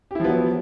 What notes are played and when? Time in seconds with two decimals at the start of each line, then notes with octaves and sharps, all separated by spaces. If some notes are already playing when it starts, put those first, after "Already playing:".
0.11 G4
0.15 E4
0.20 F3
0.24 B3
0.29 F#3